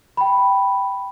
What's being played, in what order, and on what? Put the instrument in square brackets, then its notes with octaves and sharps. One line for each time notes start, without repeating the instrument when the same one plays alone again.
[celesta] G5 B5